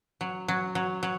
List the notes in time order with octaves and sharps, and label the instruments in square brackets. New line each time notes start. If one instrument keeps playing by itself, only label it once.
[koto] F#3
F#3
F#3
F#3